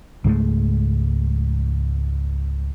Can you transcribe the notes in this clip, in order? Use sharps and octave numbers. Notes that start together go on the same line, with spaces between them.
C#2 G#2 G#3 A3